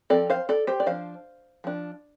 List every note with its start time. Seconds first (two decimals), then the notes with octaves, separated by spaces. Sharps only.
0.10 F3 C4 A4 D5
0.30 C5 F5
0.49 A4 D5
0.67 G4 C5
0.80 D5
0.86 F3 D4 C5 F5
1.64 F3 D4